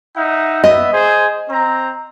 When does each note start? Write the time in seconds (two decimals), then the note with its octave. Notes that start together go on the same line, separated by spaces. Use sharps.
0.15 D#4 E5 F#5
0.64 B3 D#5 E5
0.92 G#4 C5
1.50 C4 A#5